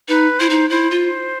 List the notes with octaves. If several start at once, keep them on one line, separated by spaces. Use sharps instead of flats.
D#4 B4
E4 C5
D#4
E4 C5
F4